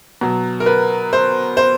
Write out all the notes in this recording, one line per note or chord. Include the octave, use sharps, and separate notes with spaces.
B2 F#3
A#4
B4
C5
C5